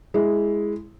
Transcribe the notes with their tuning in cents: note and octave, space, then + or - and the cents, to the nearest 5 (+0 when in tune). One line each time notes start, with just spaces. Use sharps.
G#3 +0 E4 +0